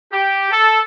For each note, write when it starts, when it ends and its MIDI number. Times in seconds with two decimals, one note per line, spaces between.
0.12 0.47 67
0.51 0.80 69